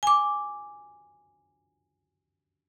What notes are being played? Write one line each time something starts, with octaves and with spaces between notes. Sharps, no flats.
G#5 D6